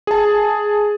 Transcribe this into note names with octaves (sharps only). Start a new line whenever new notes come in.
G#4 A5